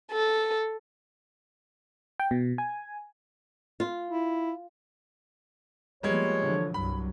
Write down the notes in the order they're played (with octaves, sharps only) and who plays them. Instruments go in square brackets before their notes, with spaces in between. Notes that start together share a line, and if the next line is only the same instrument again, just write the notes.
[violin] A4
[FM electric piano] G5
B2
G#5
[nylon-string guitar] F4
[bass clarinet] E4
[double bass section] F3 A#3 B3 [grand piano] G3 G#3 G#6 [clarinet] C#5
[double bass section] D3 E3 F3
[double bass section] C2 G2 F#3 [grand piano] B5